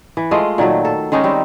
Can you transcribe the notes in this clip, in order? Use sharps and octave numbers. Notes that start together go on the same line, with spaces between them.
E3
G#3 A3 F4 D#5
A#2 D#3 F#3 A3
A4
D#3 G#3 C#4 D#4
G3 C4